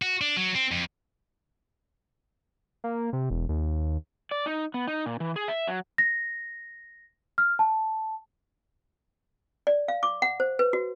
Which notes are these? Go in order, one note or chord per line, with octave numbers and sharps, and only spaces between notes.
F#4
D4
F#3
C4
F2
A#3
C3
E1
D#2
D5
D#4
B3
D#4
A#2
E3
G#4
E5
F#3
A#6
F6
A5
D5
F5
D6
F#5
C5
B4
F#4